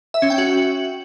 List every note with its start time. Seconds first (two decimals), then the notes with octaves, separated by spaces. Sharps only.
0.14 E5
0.22 C#4
0.30 G5
0.38 F#4